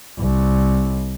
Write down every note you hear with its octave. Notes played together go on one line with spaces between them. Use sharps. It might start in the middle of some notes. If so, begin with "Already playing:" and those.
C2